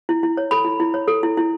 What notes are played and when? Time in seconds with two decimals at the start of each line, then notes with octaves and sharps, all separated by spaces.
0.09 E4
0.23 E4
0.37 C#5
0.51 A4 B5
0.65 E4
0.80 E4
0.94 C#5
1.08 A4
1.23 E4
1.37 E4